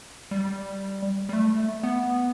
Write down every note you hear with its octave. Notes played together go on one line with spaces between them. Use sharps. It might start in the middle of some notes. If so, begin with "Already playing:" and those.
G3
G3
A3
B3